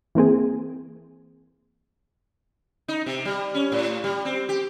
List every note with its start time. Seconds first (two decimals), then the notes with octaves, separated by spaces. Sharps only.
0.15 E3 A#3 C4 G#4
2.88 D#4
3.06 C3
3.25 G3
3.55 C#4
3.72 A2
4.04 G3
4.25 C4
4.49 G4